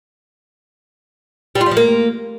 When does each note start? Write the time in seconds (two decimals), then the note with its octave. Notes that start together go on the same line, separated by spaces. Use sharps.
1.55 G3
1.61 F4
1.66 G3
1.71 F3
1.77 A#3